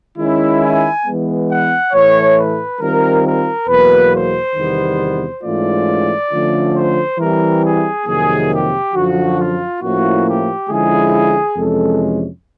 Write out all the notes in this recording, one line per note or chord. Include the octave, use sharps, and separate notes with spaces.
D#3 G#3 C#4 E4
G#5
E3 G#3 B3
F#5
A2 E3 A3 C#5
B4
D#3 G3 C4 F4 A#4
A#4
E2 B2 F#3 A#3 B4
C5
E2 C3 D#3 G3 B3
G#2 E3 A3 C#4 F4 D5
D3 F3 A3 C#4 F4
C5
E3 G3 C4 E4 A#4
G#4
F2 C3 D#3 F#3 A#3 G#4
G4
F#2 D3 F3 F#4
F4
A2 F3 A#3 C#4 E4 F#4
G4
D3 F3 G#3 C#4 E4 G#4
F2 C3 E3 G#3 C#4 A4